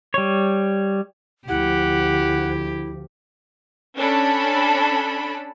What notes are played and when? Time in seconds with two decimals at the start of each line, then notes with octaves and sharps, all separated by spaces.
0.14 G3 C#5
1.48 D2 F3 E4 G4 F#5
3.97 C#4 D4 A4 B5